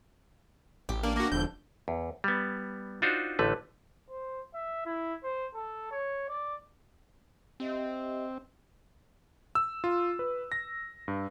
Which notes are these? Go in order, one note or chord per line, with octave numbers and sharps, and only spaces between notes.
A1 G4
A#3 D4
A#3 F#4 D6 A#6
E1 E2 D3 F3 G6
E2
G3 B3
D4 D#4 F4 F#4 C5
A1 D3 A3 B4
C5
E5
E4
C5
A4
C#5
D5
C4 G4 D#5 E5
E6
F4
B4
A#6
G2